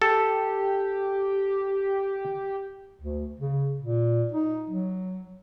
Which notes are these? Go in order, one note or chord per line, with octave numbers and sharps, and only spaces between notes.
G4 A4
D2
C#3
A#2
D#4
F#3